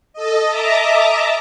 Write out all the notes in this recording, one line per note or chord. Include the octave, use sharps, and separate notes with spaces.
A4 D#5
D#5 E5 A5 A#5 D6